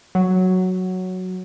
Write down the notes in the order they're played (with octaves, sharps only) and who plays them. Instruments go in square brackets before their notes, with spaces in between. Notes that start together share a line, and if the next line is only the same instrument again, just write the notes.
[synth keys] F#3